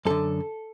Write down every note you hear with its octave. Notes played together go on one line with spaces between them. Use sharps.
F#2 D3 A4